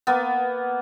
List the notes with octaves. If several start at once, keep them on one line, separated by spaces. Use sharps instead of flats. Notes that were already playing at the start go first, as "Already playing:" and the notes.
A#3 B3